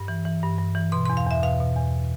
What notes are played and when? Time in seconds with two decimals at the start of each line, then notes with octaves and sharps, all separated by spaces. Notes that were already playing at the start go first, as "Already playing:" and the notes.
Already playing: G2
0.08 E3
0.25 E3
0.43 G2
0.58 G2
0.75 E3
0.92 B2 C6
1.06 E2 C6
1.17 F5
1.27 E2 E5
1.43 B2 F5
1.60 B2
1.76 E2